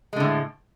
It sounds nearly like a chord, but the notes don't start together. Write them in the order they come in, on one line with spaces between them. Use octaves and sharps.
G#3 D3 A2